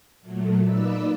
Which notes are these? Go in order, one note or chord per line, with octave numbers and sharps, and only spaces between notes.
A#2 F#3 A3
A#3 D#4 B4 D5 E6